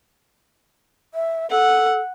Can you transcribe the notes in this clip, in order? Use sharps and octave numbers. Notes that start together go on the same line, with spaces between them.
E5
A4 F#5